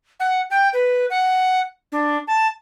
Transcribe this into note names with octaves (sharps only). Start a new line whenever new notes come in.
F#5
G5
B4
F#5
D4
A5